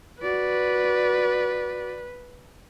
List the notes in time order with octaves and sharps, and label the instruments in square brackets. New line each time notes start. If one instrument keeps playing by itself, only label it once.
[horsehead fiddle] F#4 D5 [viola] B4